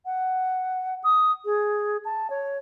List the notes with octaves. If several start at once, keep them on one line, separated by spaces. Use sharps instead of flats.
F#5
D#6
G#4
A5
C#5